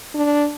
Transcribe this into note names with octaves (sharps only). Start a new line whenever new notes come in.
D4